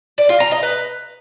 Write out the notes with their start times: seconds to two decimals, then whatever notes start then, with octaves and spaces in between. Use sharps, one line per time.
0.18 D5
0.29 F4
0.40 A#5
0.52 D#5
0.63 B4